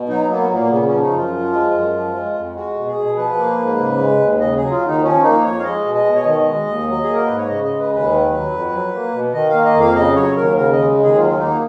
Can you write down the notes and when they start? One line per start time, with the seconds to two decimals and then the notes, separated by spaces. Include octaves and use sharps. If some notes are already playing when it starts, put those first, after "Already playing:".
Already playing: B2
0.09 F#3 D#4
0.30 A#3 B3
0.50 A#2 A#3
0.70 C#3 B3
0.86 C#4
0.91 F3
1.01 D#4
1.11 F#2
1.17 F4
1.32 F3
1.53 G#3
1.73 F#2
1.94 F3
2.14 G#3
2.35 F2
2.55 G#3 F#4
2.76 B2
2.87 G#4
2.97 B2
3.17 F3 B4
3.38 A#3
3.59 G#2
3.79 C#3
3.99 G#3
4.20 D#2
4.40 C#3 D#5
4.56 F#3 G#4
4.71 F4
4.82 D#2 D#4
5.02 F3 C#4
5.23 A#3 D#4
5.43 F2 C#5
5.60 F5
5.64 G#3 D#5
5.84 B2
5.95 D#5
6.05 B2
6.16 C#5
6.25 D#3 D#5
6.46 G#3
6.66 D#2
6.87 F#3
7.03 A#3 G#4
7.14 A#4
7.26 G#2 B4
7.37 C#5
7.48 C#3 D#5
7.64 G#3 D#5
7.79 B4
7.90 D#2
7.95 B4
8.10 D#3
8.31 F#3
8.51 F2
8.72 F#3
8.93 A#3
9.13 B2
9.34 D#3 D#5
9.49 A#3 F5
9.65 D#5
9.74 F2
9.80 F5
9.95 C#3 D#5
10.16 F#3 C#5
10.36 D#2 A#4
10.57 C#3 A#4
10.72 G#3 D#5
10.98 D#2 G#4
11.18 F#3 F4
11.30 F4
11.39 A#3 D#4